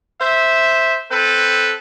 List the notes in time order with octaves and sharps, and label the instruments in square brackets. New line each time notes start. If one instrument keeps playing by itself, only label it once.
[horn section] C5 E5
C4 A4 B4